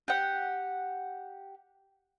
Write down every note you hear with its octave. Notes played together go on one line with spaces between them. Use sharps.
G4 F#5